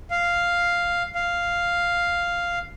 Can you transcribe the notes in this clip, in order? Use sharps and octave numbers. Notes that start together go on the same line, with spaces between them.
F5
F5